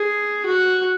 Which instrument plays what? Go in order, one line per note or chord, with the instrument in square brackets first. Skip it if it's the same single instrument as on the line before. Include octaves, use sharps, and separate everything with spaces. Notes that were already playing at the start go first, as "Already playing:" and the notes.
Already playing: [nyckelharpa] G#4
F#4